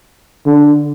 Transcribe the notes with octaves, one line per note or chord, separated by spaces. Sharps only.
D3